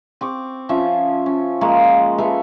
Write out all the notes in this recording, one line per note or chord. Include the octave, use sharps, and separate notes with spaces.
C4 C#6 D6
F3 C#4 E5 A5
C#4
F3 G#3 A#3 C#5
A4 B4 E5 F5